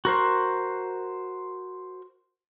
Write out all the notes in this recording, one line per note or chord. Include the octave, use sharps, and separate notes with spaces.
F#4 A#4 C5